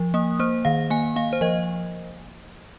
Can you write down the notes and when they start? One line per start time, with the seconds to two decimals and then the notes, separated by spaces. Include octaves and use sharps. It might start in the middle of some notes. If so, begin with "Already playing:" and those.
Already playing: F3
0.14 A#3 D#6
0.39 A#3 C5
0.65 D#3 F5
0.90 A#3 G#5
1.16 A#3 F5
1.33 C5
1.41 F3 D#5